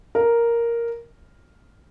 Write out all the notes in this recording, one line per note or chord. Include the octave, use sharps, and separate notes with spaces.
A#4